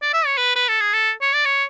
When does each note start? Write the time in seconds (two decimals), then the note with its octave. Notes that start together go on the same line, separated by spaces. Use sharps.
0.02 D5
0.13 E5
0.26 C#5
0.38 B4
0.56 B4
0.68 A4
0.80 G#4
0.94 A4
1.22 C#5
1.33 D5
1.45 C#5